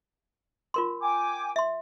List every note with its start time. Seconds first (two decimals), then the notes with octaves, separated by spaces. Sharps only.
0.74 F4 A#4 C6
1.00 G5 G#5 D6
1.56 E5 C6